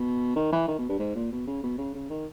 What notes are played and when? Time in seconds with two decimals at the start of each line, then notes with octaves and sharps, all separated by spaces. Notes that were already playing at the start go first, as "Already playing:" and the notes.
Already playing: B2
0.36 D#3
0.52 E3
0.68 D#3
0.78 B2
0.89 G2
0.99 G#2
1.15 A#2
1.32 B2
1.47 C#3
1.63 B2
1.78 C#3
1.94 C#3
2.10 D#3